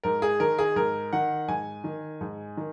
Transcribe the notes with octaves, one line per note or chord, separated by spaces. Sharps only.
G#2 A#4
G#4
D#3 A#4
G#4
G#2 A#4
D#3 F#5
G#2 G#5
D#3
G#2
D#3